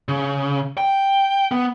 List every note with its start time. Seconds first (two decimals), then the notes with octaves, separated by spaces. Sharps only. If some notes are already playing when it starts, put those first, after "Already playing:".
0.09 C#3
0.78 G5
1.51 B3